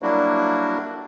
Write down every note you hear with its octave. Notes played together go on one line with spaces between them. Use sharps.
F#3 G3 A#3 D4 E4 F#4